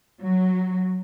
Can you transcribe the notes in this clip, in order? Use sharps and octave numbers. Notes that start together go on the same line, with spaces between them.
F#3